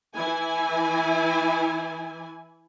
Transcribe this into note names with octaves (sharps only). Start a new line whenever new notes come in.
E3 E4 G#5